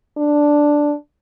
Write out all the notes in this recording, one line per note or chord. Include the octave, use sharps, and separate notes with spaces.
D4